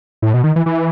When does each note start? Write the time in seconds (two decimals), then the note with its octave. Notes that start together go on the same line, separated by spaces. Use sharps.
0.22 A2
0.34 B2
0.44 D#3
0.56 E3
0.66 E3